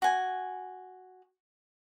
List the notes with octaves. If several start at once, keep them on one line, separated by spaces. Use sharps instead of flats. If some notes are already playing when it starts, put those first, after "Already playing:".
F#4 G#5